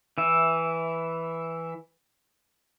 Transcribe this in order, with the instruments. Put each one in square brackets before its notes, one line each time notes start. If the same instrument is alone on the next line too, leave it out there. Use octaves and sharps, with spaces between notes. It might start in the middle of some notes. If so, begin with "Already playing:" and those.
[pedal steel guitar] E3 E5